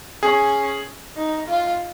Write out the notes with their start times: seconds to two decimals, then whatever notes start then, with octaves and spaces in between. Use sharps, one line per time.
0.23 C#4 G#4
1.17 D#4
1.48 F4